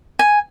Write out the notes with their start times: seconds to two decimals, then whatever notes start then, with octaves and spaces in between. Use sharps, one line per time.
0.19 G#5